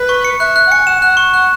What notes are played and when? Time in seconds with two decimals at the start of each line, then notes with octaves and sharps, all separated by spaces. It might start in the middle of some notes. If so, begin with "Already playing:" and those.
Already playing: B4
0.09 C#6
0.25 C#7
0.40 E5 F#6
0.56 F#6
0.67 F#5
0.71 G#5 C#7
0.87 F#5 E7
1.02 F#5 F#6
1.17 C#6
1.34 F#5 F#6